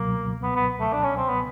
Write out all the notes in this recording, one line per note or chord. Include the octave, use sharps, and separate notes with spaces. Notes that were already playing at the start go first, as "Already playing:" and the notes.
Already playing: C#2 B2 F#3 A#3
B3
B3
A3
D4
C#4
C4
B3